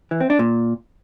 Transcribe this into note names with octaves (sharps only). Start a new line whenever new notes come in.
E3
C4
D4
A#2